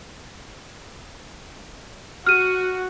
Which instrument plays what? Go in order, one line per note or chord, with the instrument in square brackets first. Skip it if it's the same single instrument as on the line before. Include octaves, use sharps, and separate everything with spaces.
[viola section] F#4 [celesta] F6 D#7